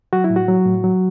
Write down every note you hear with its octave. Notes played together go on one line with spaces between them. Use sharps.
F#3 F#4
E4
A2
F#4
F#3
A2
F#3